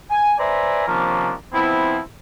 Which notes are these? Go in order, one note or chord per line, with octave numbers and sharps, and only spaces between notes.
G#5
B4 C5 D5 E5 G#5 A#5
C3 D#3 F3 A#3 C#4 D4
F3 B3 C4 E4